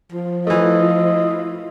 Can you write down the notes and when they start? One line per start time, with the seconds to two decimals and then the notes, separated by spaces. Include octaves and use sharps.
0.12 F3 F4
0.47 E3 A3 E4 F4 D#5